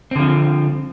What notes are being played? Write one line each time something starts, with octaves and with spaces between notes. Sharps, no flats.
D3 F3 C4